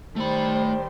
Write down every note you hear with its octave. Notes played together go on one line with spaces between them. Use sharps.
D#3 G3 A3 C5 B5